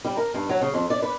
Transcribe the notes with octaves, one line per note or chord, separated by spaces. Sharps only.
G3
A#4
G2
F#3
C#3
F2
D5
B4